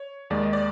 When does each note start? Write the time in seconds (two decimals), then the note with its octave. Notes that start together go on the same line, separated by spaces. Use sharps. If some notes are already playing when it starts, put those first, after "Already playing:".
Already playing: C#5
0.30 D#2 D#3 G#3 D5
0.43 D#5
0.53 D5